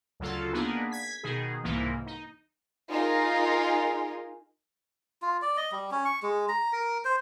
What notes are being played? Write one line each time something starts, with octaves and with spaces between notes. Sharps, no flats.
D2 C#3 F#3 F4 A4
A#3 B3 D4 D#4 G#4
G#6 B6
B2 D#3 D#4 G#4
C2 G#2 C3 E3 A#3
D#4
D#4 F4 G#4 A#4
F4
D5
D#5
G3
C#4
C#6
G#3
A#5
A#4
C5